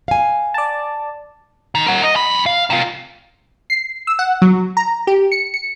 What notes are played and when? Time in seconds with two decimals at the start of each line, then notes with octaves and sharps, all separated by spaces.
0.08 F5 G#5
0.54 D5 A5
1.75 D#3
1.87 A#4 F#5
2.03 D#5
2.15 F2 B5
2.46 F5
2.70 C3 F4
3.70 C7
4.07 E6
4.19 F#5
4.42 F#3
4.77 A#5
5.07 G4
5.32 C#7
5.54 C#7